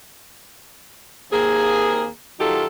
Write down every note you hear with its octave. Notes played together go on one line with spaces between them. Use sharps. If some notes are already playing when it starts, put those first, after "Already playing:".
D#2 A#3 C4 G#4
D#3 F#3 D#4 F4 G4 A4